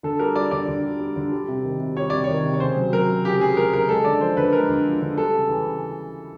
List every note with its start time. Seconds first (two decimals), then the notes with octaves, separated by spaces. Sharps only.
0.03 D3 A4
0.19 G3 A#4
0.35 G3 D5
0.51 D3 D5
0.68 D3
0.84 G3
1.00 G3
1.16 D3
1.31 G3
1.48 C3
1.64 D#3
1.80 C3
1.96 G3 C#5
2.10 C3 D5
2.24 C#5
2.29 D#3
2.44 C3
2.53 C#5
2.60 C#3 C5
2.76 F#3
2.92 F#3 A#4
3.09 C#3
3.25 C#3 G4
3.40 F#3 G#4
3.57 F#3 A#4
3.73 C#3 A#4
3.88 G#3 A4
4.04 D3 D5
4.21 F3 C5
4.37 D3 B4
4.53 G#3 A#4
4.69 D3
4.86 F3
5.01 D3
5.17 G3 A4
5.33 C#3
5.49 E3
5.66 C#3